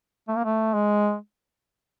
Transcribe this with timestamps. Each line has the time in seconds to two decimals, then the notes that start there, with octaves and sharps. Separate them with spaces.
0.28 A3
0.36 A#3
0.45 A3
0.74 G#3